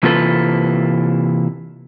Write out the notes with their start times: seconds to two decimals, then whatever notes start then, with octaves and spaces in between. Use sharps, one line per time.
0.03 C3 E3 A#3 F4 A4 B4